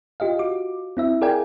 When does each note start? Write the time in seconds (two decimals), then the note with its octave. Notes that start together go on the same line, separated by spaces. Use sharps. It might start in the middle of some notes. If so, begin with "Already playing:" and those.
0.20 F4 G4 D#5 F5
0.39 F#4 D6
0.97 C4 E4 E5
1.21 G#4 A#4 D5 F5 G5 G#5